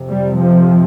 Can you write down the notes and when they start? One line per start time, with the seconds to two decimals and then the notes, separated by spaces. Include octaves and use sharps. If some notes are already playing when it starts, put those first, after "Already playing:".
Already playing: F2 C3
0.09 G3
0.38 F3